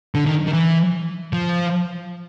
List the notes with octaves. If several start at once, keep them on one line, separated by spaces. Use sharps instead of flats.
D3
D#3
D#3
E3
F3